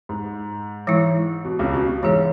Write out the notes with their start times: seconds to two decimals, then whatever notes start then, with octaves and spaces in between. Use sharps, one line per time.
0.09 G#2
0.87 E3 G#3 E4
1.45 B2
1.59 C#2 C#3
1.74 B2
1.88 B2
2.03 G#2 E3 G#3 E4 G#4 C#5